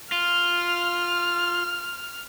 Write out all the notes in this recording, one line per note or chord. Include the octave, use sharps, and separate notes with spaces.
F4 F6